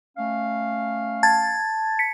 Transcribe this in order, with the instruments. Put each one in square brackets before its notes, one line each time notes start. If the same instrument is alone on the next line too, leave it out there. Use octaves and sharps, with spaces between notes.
[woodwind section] A3 C#4 F5
[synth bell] A5 G#6 A6
B6 C#7